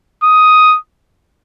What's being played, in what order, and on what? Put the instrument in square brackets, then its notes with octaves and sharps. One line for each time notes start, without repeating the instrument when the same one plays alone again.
[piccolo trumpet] D#6